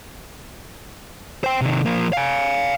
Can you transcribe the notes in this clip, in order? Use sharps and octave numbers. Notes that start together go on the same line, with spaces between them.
C5 G5
C3 D#3
F3 A#3
F5 G#5